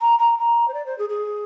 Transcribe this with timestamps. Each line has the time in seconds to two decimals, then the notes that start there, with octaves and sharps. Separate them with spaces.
0.01 A#5
0.19 A#5
0.38 A#5
0.68 C5
0.74 D5
0.86 C5
0.99 G#4
1.09 G#4